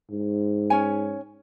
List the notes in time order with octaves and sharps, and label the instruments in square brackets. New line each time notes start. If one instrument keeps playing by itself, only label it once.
[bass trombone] G#2
[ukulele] C#4 C#5 G#5